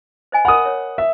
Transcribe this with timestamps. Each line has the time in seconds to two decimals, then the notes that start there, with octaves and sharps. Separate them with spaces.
0.32 C5 D#5 G#5
0.45 A#4 D#5 F#5 B5 D#6
0.65 C#5
0.98 E5